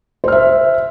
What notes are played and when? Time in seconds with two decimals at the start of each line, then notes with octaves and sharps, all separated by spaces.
0.24 C5
0.28 F6
0.32 E5